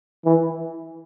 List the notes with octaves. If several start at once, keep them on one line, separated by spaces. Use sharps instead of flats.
E3